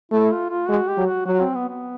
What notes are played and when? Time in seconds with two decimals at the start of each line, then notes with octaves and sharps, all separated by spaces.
0.12 A3 E4
0.31 F4
0.49 F4
0.69 G#3 F#4
0.88 G4
0.98 F#3
1.07 F#4
1.26 F#3 F#4
1.40 C4
1.55 B3
1.69 B3